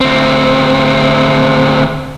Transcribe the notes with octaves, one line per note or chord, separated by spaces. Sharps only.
D2 C4